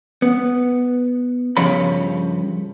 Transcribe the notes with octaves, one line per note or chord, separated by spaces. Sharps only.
B3
G2 C#3 F3 A#4 C#5 B5